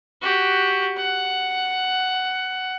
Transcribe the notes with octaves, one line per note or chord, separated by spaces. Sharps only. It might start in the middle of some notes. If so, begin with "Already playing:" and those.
F#4 G4
F#5